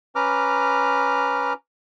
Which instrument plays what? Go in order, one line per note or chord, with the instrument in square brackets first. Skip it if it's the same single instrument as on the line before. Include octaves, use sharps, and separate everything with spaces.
[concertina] C#4 B4 A#5 D6 F6